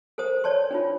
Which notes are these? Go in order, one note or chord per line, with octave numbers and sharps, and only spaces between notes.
A4 A#4 C5 D#6
C#5 D5 A5 C6
D4 D#4 F4